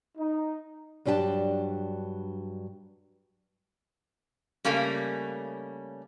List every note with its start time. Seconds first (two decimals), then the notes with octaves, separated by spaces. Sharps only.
0.16 D#4
1.05 G2 F#3 D4 G4 G5 A5
4.65 C#3 G3 A3 A#3 C#4